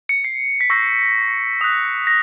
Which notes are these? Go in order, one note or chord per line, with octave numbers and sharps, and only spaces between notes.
C#7
C7
B6
C#6 E6 G6 A#6
D#6 F#6
A#6